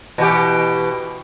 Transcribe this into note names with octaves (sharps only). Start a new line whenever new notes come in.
B2 E3 G4